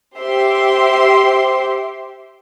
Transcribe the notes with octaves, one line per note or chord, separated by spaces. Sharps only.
G4 C5 E5 C6